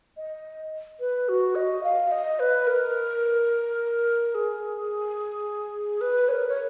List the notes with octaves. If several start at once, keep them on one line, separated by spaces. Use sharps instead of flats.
D#5
B4
F#4
D#5
F5
D#5
B4
A#4
G#4
B4
C#5
A#4
C#5